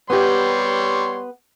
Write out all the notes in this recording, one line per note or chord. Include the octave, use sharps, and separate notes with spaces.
G3 B3 G4 C#5 C6